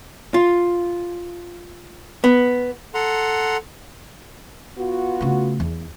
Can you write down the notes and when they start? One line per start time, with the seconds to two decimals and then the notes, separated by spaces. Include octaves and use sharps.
0.34 F4
2.24 B3
2.94 A4 F#5 A#5 C6
4.78 B3 F4 F#4
5.21 C#3 A3
5.60 E2